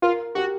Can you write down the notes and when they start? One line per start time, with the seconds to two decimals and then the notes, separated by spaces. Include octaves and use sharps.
0.02 F4 A#4
0.35 F#4 G4